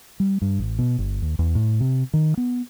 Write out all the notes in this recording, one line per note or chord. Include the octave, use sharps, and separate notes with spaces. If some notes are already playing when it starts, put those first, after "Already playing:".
G3
G2
A1
B2
G1
D#2
E2
A2
C3
D#3
B3